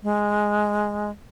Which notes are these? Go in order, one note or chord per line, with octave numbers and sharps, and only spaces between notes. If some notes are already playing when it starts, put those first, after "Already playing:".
G#3